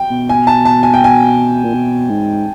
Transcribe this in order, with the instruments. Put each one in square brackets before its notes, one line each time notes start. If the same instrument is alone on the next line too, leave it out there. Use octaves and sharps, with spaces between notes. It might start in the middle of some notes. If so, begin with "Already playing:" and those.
Already playing: [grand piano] G5
[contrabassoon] B2
[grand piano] G#5
A5
A5
G#5
G5
G#5
[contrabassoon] A#2
B2
G#2